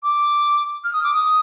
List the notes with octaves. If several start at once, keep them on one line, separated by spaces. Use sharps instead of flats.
D6
F6
D#6
D6
D#6